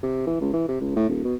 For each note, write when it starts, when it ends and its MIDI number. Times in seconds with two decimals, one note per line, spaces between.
0.03 0.27 48
0.27 0.38 52
0.41 0.51 37
0.53 0.65 52
0.68 0.78 48
0.80 0.92 37
0.96 1.08 45
1.09 1.21 27
1.24 1.35 47